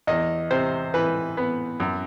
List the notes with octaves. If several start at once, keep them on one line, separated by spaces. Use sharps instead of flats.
E2 D#5
C3 C5
E3 B4
B3
F#2